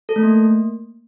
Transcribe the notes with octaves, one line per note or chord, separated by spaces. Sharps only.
A4
A3
A#3